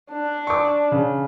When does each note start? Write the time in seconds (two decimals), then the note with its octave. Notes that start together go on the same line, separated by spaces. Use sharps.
0.11 D4
0.47 C#6 D6
0.92 C#3